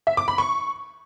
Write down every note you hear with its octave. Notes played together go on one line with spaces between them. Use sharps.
E5
D6
B5
C#6